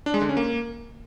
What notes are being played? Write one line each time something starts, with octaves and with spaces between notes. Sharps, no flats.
D4
G#3
D3
C#4
A#3